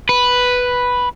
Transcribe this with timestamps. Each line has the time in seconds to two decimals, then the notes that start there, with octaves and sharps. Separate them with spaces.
0.09 B4